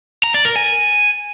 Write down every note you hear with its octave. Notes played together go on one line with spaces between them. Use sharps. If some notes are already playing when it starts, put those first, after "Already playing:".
A#5
D5
A#4
G#5